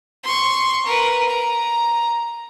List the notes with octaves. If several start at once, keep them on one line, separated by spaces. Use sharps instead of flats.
C6 C#6
A#4 B4
A#5